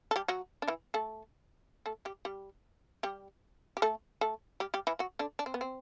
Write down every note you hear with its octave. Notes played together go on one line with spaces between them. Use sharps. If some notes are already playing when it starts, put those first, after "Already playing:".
A4
G3 G4
F#3 F#4
D4
E3 E4
A3 A4
A3 A4
G3 G4
G3 G4
G3 G4
G4
A3 A4
A3 A4
G3 G4
G3 G4
E3 E4
F#3 F#4
D3 D4
D4
C4
B3
C4